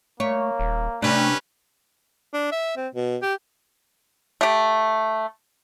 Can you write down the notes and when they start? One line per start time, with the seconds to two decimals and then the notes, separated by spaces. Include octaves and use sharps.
0.20 A3 A#3 C#5
0.60 D#1
1.02 C3 G3 A3 C#4 D4 B4
2.34 D4
2.52 E5
2.77 C4
2.95 B2
3.22 G4
4.41 A3 G4